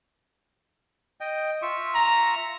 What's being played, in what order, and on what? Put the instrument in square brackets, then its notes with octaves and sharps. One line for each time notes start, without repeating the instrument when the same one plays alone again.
[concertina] D#5 G5
F4 E5 C#6
[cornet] A#5